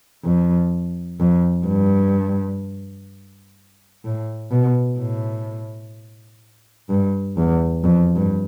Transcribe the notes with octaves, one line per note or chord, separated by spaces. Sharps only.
F2
F2
G2
A2
B2
A2
G2
E2
F2
G2